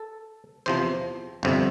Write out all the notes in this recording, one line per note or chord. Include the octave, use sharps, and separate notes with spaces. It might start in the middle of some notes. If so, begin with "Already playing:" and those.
Already playing: A4
E2 C3 F3 C5
G1 F2 C3